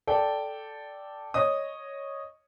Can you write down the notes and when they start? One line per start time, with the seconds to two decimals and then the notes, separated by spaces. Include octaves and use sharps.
0.07 A4 D5 G5
1.34 C#5 D#5 D#6